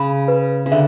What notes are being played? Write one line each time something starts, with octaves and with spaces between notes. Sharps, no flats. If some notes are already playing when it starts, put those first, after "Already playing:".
Already playing: C#3 B5
B4
C#3
D3 E5